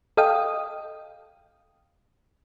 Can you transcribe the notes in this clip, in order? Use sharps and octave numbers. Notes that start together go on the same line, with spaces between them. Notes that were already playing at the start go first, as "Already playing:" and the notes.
A4 D#5 F5 G5 D#6